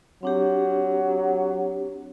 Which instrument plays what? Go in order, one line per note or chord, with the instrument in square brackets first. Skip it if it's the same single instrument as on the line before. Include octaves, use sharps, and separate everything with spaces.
[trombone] F#3 [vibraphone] C4 D4 G4